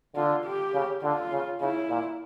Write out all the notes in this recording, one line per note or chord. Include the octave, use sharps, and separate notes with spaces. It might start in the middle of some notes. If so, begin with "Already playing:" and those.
D3 F4
G4
C#3
D3 F4
C#3
C#3 E4
A#2